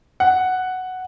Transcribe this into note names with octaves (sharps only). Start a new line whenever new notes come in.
F#5